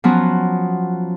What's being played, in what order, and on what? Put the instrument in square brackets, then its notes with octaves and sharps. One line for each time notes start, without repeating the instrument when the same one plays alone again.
[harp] F3 F#3 B3 C#4 F4 F#4